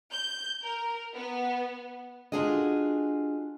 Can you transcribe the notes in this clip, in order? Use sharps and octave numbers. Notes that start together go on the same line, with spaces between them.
G6
A#4
B3
D4 F4 F#4 G#4 A4 D#5